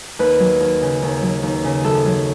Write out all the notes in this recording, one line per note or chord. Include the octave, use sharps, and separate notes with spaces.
D#2 B4
F#3
D#2
C#3
D#2
F#3
D#2
C#3
F#2 A4
F#3